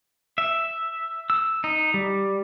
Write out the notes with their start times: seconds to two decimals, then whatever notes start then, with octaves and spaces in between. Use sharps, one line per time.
0.38 E5
1.30 E6
1.64 D#4
1.94 G3